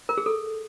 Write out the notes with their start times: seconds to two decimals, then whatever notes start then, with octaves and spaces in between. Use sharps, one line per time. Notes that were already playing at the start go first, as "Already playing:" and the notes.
0.09 A#4
0.18 G#4
0.26 A4